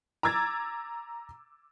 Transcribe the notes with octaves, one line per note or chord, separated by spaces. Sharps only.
A#5 D6 E6 G#6 A6